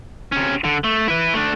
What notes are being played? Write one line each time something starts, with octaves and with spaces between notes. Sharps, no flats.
C3 C#4
D3
A3
E4 B4
A3 D4